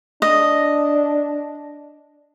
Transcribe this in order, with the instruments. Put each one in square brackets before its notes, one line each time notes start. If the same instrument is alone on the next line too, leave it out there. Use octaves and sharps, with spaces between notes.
[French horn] D4 [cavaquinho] D#5